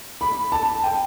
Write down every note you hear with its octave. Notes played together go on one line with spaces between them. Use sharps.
B5
A5
G5